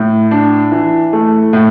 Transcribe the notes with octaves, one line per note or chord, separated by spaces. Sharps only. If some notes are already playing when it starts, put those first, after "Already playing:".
Already playing: A2
D4
E3
A3
A2